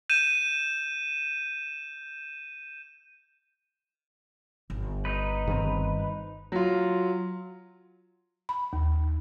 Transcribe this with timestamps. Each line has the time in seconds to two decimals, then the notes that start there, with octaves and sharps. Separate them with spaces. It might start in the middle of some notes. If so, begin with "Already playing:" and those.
0.10 G6 D#7 E7
4.70 G1
5.05 D#4 B4
5.47 G2 D#3 C4
6.52 F#3 F4
8.49 B5
8.73 D#2